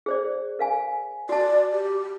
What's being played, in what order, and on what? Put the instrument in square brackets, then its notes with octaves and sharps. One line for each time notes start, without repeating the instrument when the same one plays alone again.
[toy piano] G#4 C5 D5
A#4 F5 G#5
[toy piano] F#4 A5 [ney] D5
[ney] G4